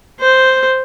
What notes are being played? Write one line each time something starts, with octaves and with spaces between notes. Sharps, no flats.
C5